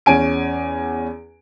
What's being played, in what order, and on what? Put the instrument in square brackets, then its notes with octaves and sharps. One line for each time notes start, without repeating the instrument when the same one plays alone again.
[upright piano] E2 C#4 G#5 D7